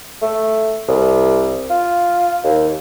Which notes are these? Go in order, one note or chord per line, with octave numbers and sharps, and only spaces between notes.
A3
C2
F4
D#2